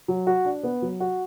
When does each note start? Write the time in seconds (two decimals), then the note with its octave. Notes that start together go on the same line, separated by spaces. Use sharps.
0.08 F#3
0.27 F#4
0.45 D4
0.63 B3
0.82 F#3
1.00 F#4